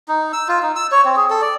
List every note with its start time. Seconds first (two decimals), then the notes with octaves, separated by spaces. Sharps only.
0.08 D#4
0.33 E6
0.48 F4
0.63 D#4
0.76 E6
0.92 C#5
1.05 C4
1.16 G#4
1.30 A4
1.42 D5